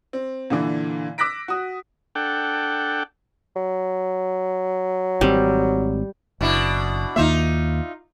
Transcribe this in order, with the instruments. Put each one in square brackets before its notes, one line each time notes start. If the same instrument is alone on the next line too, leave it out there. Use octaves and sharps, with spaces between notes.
[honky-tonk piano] C4
A#2 D3 E3
D6 E6 F#6 A#6 B6 D7
F#4 D#6
[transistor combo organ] D4 A4 F#5 G5
[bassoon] F#3
[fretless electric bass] G#1 C4 [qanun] G3
[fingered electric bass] F#1 [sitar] B2 D4 E4
[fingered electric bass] D#2 D#3 A#3 [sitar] D#4 F4 E5